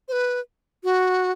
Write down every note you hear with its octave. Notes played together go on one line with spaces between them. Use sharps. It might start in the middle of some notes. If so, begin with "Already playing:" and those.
C5
B4
F#4